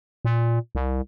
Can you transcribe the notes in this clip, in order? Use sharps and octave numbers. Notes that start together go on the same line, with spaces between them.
A#2
C2